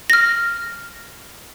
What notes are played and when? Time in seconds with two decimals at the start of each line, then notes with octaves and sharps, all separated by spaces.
0.10 F6 A#6